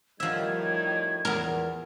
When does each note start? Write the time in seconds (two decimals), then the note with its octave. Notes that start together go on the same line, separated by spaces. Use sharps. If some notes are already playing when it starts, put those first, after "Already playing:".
0.20 A2 D#3 F3 G3 E5 G#6
1.25 E2 A#4